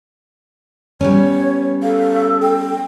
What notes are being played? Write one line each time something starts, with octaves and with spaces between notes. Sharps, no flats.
G3 B3 C#4 C#5
A4 F5
G5